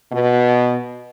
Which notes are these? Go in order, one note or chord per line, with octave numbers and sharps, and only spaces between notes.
B2